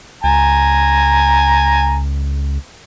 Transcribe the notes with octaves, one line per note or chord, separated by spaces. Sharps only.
C#2 G#5 A#5